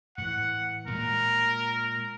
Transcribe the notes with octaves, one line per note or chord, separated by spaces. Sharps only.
A2 E3 F#5
A#2 G#3 A#4